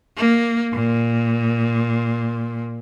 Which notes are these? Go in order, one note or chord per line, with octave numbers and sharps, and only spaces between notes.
A#3
A#2